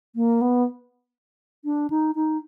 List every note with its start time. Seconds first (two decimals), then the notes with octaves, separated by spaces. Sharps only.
0.16 A#3
0.41 B3
1.65 D4
1.90 D#4
2.15 D#4